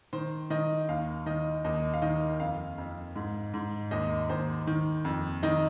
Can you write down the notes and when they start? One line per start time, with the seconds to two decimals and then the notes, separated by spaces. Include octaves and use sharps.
0.13 D#3 C5
0.50 D#3 D#5
0.89 D#2 F5
1.26 D#3 D#5
1.64 D#2 D#5
1.94 F5
2.02 D#3 D#5
2.40 F2 F5
2.78 F2
3.16 G#2
3.54 G#2
3.91 D#2 D#5
4.29 D#2 C5
4.67 D#3
5.05 F2
5.43 D#3 D#5